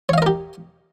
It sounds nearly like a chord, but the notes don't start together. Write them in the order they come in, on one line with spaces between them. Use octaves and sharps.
C#5 F5 D#5 A#4 G4